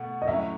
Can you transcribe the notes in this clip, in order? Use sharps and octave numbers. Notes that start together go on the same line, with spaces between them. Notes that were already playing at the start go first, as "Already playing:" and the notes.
Already playing: B2 A3 F#5
D#5
A2 F#3 C#4 E5